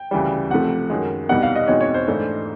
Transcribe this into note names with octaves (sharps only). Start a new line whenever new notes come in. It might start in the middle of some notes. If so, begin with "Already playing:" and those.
Already playing: G5
D2 C#3 E3 G3
C3 F3 A3 F#5
F#2 D#3 G#3
C2 B2 G3 B3 D#4 F#5
F5
D#5
E2 B2 G#3 C4 D#4 C#5
C#5
C5
G#2 E3 A3 D4